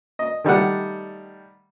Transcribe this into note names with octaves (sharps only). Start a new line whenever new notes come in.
D#5
D#3 G3 A3 F#5